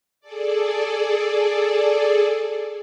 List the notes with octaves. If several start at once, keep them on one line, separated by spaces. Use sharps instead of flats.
G#4 A4 D5